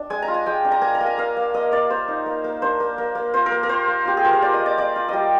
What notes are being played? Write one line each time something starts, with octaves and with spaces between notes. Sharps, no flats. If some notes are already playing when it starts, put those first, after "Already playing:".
Already playing: D4
G#3 G#5
A#5
F4
G#5
G#3 G5
D4
A#5
A#3 G#5
A#5
A#3
G#5
A#3 F5
A#3
A#3 D#5
A#3 D5
A#3 C5
D#4
A#3
A#3
D4 C5
A#3
A#3
A#3
F4 C5
A#4
A#3
A#4
F4 C5
A#3
F4 G4
G#4
F4 A#4
C5
A#3 D5
D#5
A#3
D5
A#3 D5
F4
G3 D5 D#5